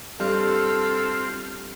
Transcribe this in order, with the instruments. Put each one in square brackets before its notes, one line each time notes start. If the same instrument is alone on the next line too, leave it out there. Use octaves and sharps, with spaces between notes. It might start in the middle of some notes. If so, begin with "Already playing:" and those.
[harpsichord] G2 [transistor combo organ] C4 F4 [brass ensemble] A4